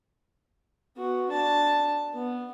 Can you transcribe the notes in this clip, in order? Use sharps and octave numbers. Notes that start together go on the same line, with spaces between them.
B3 F#4
D4 A5
B3